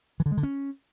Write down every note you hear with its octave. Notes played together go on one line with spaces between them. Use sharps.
E3
D3
G#3
D3
C#4